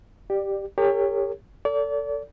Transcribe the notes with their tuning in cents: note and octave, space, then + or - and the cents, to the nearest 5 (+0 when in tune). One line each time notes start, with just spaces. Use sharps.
G4 +0 D5 +20
G4 +30 A#4 -40 C#5 +0
A4 +25 D5 -35